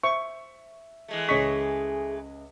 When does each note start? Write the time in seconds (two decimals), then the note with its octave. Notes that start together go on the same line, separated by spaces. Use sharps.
0.03 C5 E5 C#6
1.08 E3 G#3 A3
1.29 C#2 G#4 C#5 D#5 C#6 B6